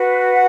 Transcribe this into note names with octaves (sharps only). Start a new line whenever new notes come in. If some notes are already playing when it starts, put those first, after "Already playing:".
Already playing: F#4 B4
F#5